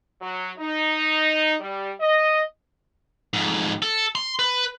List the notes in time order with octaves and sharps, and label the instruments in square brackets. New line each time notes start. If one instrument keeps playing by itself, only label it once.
[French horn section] F#3
D#4
G3
D#5
[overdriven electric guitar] F2 G#2
A4
C6
B4